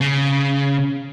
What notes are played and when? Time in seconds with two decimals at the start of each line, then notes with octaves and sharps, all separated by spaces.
0.01 C#3